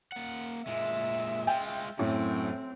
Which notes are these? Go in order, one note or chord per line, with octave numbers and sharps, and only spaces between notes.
A#3 F#5
A#2 G#3 E5
G#3 F4 G5
F#2 A2 C4